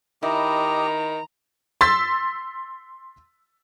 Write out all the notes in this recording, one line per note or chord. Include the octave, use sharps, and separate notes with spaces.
D#3 E4 G4 D#5 A#5
C6 E6 A6 B6